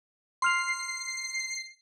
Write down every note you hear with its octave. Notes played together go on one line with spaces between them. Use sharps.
C6 F6 C7 F7